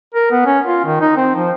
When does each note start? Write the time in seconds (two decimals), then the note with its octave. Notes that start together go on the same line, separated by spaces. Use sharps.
0.14 A#4
0.31 B3
0.46 C#4
0.67 F4
0.85 D#3
1.01 D#4
1.17 C4
1.35 F3